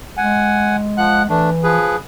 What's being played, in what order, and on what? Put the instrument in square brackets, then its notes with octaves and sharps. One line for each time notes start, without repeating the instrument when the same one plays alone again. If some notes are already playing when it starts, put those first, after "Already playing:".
[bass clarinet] G#3 [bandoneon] F#5 G#5
[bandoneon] F3 F#5 F#6
[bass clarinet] E3 [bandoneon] A3 D4
[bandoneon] F3 G#4 B4